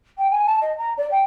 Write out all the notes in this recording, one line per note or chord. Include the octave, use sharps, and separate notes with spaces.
G5
G#5
A5
D#5
A#5
D5
G5